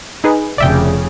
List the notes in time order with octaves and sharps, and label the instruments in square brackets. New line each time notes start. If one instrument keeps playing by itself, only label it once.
[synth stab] D#4 G#4 B4
[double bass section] F1 C#3 [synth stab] D5 E5 G5